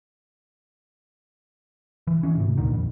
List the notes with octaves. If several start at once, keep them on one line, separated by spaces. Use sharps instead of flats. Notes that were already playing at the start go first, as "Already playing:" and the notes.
E3
E3 C#4
D2 G#2 C3
D2 A#2 D3 D#3
A#1 F2